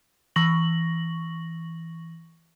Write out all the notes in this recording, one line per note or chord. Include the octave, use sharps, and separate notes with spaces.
E3 C#6 A#6 F#7